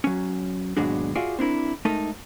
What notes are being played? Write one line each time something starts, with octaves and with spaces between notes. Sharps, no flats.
F#3 C#4
D#2 G#2 B2 F#3 G#3 D4
F4 F#4 G#4 D5 E5
C4 D4 E4 A#4
G#3 A3 D#4 A4 A#4